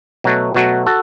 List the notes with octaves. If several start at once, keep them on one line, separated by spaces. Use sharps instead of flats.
B2 F#3 A3 F#4
B2 F#3 A3 F#4
F#4 A4